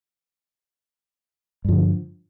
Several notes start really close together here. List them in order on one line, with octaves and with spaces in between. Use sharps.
G2 F3 D3